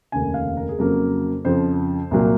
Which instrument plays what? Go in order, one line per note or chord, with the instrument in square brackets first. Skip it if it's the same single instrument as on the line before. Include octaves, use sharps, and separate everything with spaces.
[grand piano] F1 D#2 C#3 G#5
F5
A#4
G#4
F2 C#3 F#3 A#3 A#4
F2 C#3 F3 C5
C2 A#2 F#3 A#3